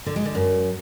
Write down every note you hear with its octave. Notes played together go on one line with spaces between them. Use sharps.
D3
G#3
D3
F#2